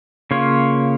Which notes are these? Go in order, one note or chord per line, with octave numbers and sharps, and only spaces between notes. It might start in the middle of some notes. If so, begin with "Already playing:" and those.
C#3 A#3 F4 C#5